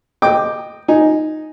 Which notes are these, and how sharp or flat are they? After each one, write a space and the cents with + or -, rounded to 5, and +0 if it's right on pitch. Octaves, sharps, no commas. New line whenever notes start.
D#5 -10 G5 +0 D6 +5
D#4 +0 G#5 +0